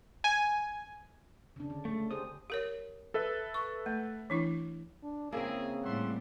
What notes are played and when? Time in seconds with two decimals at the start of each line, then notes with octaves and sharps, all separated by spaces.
0.24 G#5
1.56 C#3 D4
1.70 D3
1.85 A3
2.11 G4 G#4 C5 D#6
2.50 G4 A#4 C#5
3.14 A4 B4 E5
3.54 C#6
3.86 A3
4.30 E3 D4 E4
5.03 D4
5.32 C#3 A#3 C4 E4 G#4
5.83 A2 G3 E5 F#5 C6